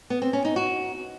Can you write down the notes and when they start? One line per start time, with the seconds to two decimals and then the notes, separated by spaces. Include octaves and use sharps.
0.10 B3
0.22 C4
0.33 C#4
0.45 D#4
0.56 F#4